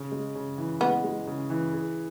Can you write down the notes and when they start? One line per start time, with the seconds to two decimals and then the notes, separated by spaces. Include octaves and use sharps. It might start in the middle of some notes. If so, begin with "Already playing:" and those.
Already playing: C#3
0.12 G#3
0.35 C#3
0.58 E3
0.81 G#3 B3
1.04 G#3
1.27 C#3
1.50 E3
1.73 G#4